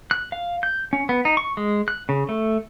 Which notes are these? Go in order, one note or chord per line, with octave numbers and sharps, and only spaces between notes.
F#6
F5
G6
C#4
B3
D#4
C#6
G#3
F#6
C#3
A3